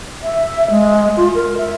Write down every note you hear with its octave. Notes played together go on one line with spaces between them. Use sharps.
E5
G#3
F4
A#4
E5